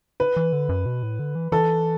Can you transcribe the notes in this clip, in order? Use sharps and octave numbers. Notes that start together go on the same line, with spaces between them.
B4
E3
D3
F#2
B2
A2
D3
E3
E3 A4